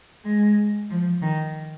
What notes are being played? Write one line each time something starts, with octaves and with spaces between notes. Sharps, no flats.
G#3
F3
D#3